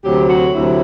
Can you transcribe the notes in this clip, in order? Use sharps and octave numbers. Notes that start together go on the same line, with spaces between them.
D2 C3 F#3 G4
F#4
D2 C3 F#3 E4